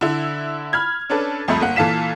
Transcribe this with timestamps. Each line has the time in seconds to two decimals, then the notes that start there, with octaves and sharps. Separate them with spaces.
0.01 D3 E4
0.73 B5 F6 G#6
1.10 C#4 D4 A4 B4
1.48 C2 F2 A3 E5 B5
1.60 G1 A#3 F#5
1.76 A#2 E3 A4 F5 B6 E7